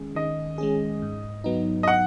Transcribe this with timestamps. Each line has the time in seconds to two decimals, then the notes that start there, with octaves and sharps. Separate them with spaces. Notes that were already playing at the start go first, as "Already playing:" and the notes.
Already playing: D#3 G#3 C#4 G#4
0.15 D#3 D#5
0.58 G#3 C#4 G#4
1.02 G#2
1.44 F#3 B3 D#4
1.83 D#5
1.88 F#5